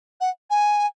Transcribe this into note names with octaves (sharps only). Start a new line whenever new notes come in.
F#5
G#5